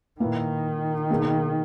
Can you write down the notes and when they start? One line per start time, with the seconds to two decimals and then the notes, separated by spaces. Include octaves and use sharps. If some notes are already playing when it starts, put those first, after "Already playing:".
0.20 A#2 D#3 A#3 E4 B4
1.10 B2 A#3 D#4 G#4 B4